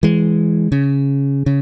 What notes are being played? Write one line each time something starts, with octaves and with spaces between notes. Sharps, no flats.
E3 G#3
C#3
C#3